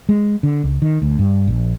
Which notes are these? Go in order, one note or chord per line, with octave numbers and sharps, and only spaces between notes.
G#3
D3
C#2
D#3
D2
G2
A#1